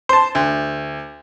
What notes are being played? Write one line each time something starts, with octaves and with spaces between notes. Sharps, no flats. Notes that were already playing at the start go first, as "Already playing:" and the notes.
C5 A5
D2